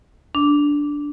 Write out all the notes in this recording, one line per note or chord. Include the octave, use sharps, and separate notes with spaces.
D4